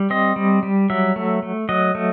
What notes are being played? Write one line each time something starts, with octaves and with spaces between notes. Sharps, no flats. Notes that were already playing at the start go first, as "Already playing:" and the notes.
Already playing: G3
C4 D#5
G3
G3
F#3 E5
A3
A3
F#3 D#5
A3